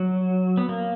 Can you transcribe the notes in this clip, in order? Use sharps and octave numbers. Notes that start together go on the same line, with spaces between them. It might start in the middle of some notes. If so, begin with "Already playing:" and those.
Already playing: F#3
B3
A#3